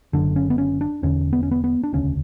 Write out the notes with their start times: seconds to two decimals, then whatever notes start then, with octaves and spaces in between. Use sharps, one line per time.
0.13 F#1 F#2 D3 D4
0.36 C#4
0.50 B3
0.58 C#4
0.81 D4
1.03 E1 E2 D3 C#4
1.33 B3
1.43 C#4
1.51 B3
1.64 B3
1.84 D4
1.93 E1 D2 C#3 C#4